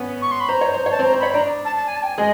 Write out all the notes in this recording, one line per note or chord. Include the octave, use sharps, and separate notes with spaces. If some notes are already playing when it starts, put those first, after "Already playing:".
Already playing: B3 C#4 B4
C#6
C6
B5
C5 A#5
C#5
C5
C#5
A5
C4 C5
A#5
C5
C#5 B5
D4 D5 A#5
A5
A5
G#5
A5
G5
G#5
G#3 G#4 D#5